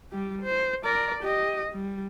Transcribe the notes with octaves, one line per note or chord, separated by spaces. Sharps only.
G3 G4
C5
A#4 D5
G4 D#5
G3